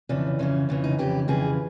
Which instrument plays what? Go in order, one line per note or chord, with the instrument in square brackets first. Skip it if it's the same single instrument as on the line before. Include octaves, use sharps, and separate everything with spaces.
[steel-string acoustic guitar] F2 C#3 E3 D4
F2 C#3 E3 C#4
F2 C#3 E3
D#4
F2 C#3 E3 G4
F2 C#3 E3 G#4